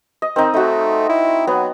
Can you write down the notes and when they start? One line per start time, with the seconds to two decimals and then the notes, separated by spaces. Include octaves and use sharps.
0.22 D#5
0.36 D#3 C4 D#4
0.54 A3 D#4 F#4
1.09 E4
1.47 F#3 B3